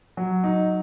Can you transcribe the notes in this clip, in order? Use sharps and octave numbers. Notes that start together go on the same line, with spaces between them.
F#3
D#4